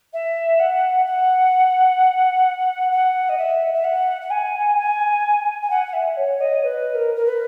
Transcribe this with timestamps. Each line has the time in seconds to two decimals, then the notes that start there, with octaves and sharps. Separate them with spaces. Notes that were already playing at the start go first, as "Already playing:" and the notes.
0.13 E5
0.59 F#5
1.05 F#5
2.91 F#5
3.29 D#5
3.38 E5
3.74 E5
3.84 F#5
4.21 F#5
4.30 G#5
4.78 G#5
5.62 G#5
5.70 F#5
5.86 F#5
5.93 E5
6.17 C#5
6.40 D#5
6.63 B4
6.94 A#4
7.16 A#4
7.25 B4